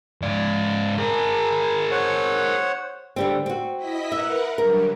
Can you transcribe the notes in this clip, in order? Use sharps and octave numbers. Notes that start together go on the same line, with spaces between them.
G#2 D5
G#4 A#4
C5 C#5 F#5
D3 G3 C4
C4 F#4
E4 D#5 B6
A#4 B4 E5 F#5
D3 F#3 G3 A#4